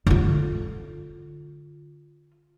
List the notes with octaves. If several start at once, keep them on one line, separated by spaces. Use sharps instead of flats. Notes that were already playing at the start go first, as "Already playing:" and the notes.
D3 F4